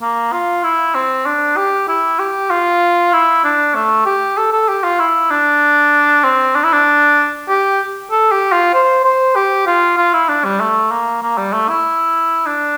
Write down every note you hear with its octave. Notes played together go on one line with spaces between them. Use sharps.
A#3
F4
E4
C4
D4
G4
E4
G4
F4
E4
D4
A3
G4
A4
A4
G4
F4
E4
D4
C4
D4
E4
D4
G4
A4
G4
F4
C5
C5
G4
F4
F4
E4
D4
G3
A3
A#3
A#3
G3
A3
E4
D4